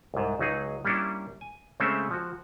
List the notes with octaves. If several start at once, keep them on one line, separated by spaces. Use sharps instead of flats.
C2 G#2
C#2 F#3 D#4 G#4
G3 A#3 C#4 D4 E4
G#5
C#3 G#3 A3 C4 C#4 E5
F3 F#4